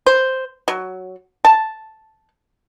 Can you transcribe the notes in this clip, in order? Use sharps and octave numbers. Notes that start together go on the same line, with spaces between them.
C5
F#3
A5